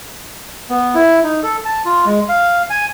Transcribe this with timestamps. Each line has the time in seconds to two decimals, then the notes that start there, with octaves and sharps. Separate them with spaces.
0.70 B3
0.95 E4
1.24 D#4
1.43 A4
1.65 A5
1.85 F4
2.05 G#3
2.29 F5
2.70 G#5